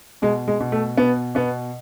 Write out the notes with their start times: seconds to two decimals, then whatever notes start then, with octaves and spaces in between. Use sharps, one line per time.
0.22 B2 G#3
0.48 G#3
0.60 B2
0.72 A3
0.97 B2 B3
1.35 B2 B3